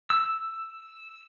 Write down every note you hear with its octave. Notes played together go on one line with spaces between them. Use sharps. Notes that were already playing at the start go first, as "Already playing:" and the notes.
E6